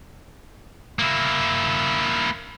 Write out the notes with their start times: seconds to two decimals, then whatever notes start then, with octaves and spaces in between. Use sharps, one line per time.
0.99 A#3 E4